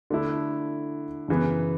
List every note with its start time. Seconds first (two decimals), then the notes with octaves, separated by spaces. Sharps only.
0.10 D3 A3 E4
1.28 F#2 C#3 E3 B3